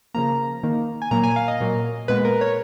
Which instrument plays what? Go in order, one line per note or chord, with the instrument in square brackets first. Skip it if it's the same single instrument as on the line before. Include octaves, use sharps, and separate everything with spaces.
[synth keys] C#3 F3 A#3 A#5
D#3 A#3
G#5
A#2 F#3 A#3 A#5
G#5
F5
D#5
A#2 F#3 A#3
A#2 G#3 B3 B4
A#4
C#5